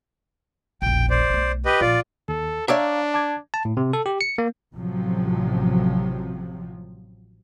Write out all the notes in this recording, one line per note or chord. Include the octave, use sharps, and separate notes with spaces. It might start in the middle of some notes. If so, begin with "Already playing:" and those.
E1 A#1 G5
C5 D5
B1 A3
G4 B4 D#5
A#1 F4 D5
D#2 A4
D4 C#5 D5 E5 F5 A#5
A5 D6 G#6
A5
A2
C3
A4
G4
C#7
A#3
A1 C3 F3 F#3